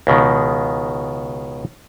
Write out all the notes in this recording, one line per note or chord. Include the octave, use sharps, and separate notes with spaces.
C#2 B2 D#3